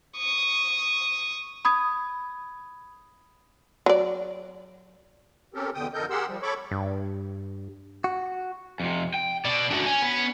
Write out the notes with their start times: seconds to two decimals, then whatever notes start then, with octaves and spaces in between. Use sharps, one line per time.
0.18 C#6 D#6
1.65 B5 D#6 G#6
3.86 F#3 D5
5.54 C4 C#4 G4 A4 A#4
5.74 E2 B2 D3 G5 D#6
5.94 F2 D3 A4 A#4 D#5 G6
6.10 G4 G#4 A#4 F#5 C6 E6
6.28 F3 G3
6.43 A4 C#5 B5 C#6 D6
6.71 G2
8.04 F#4
8.80 F2 C3
9.14 G5
9.45 B2 D5
9.71 F#2 D4 F#4
9.86 C#4 G#5
10.02 B3